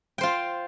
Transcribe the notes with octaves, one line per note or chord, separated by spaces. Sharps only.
F4 C5 G5